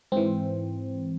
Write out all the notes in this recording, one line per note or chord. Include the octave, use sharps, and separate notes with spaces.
G#2 E3 C4